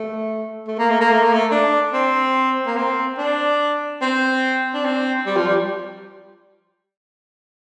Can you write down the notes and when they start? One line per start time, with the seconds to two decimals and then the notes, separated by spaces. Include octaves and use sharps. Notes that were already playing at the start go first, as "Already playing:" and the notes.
Already playing: A3
0.67 A3
0.79 A#3
0.90 A3
1.00 A#3
1.12 A3
1.23 A#3
1.33 A3
1.51 D4
1.93 C4
2.66 A#3
2.76 C4
3.18 D4
4.01 C4
4.74 D4
4.85 C4
5.26 G3
5.36 F3
5.47 G3